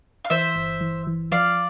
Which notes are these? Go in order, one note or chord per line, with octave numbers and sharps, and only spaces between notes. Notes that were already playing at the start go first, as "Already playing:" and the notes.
F5
E3 C5 E5
G1
E3
E3
F3 D5 F5